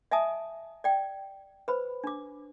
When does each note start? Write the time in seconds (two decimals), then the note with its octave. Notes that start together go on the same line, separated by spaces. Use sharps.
0.11 D#5 E5 G#5 A5 D#6
0.84 D5 G5
1.68 B4 C5 B5
2.04 D4 D6